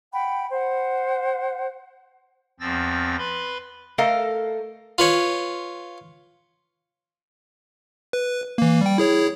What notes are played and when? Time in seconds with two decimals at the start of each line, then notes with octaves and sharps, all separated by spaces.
0.13 F#5 G5 B5
0.52 C5 F#5
2.60 E2 F3 C4 E6 A6 A#6
3.18 B4 B5 C6
3.98 A3 A4 A#4 D#5 F5
4.98 F4 B4 C#5
8.13 B4
8.58 E3 A#3
8.81 G3 G5
8.98 E4 G#4 C#5